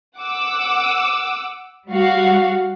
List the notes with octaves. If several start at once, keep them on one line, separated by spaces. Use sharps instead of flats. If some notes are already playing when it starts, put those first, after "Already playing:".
F#5 D6 E6
G3 F#4 F5